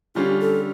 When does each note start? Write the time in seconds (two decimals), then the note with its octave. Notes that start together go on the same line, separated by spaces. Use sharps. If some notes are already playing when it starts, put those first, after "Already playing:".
0.15 D3 G3 C#4 F4 G4
0.40 A4